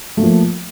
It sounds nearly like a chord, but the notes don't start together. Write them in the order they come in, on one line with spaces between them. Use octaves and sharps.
A3 A#3 F3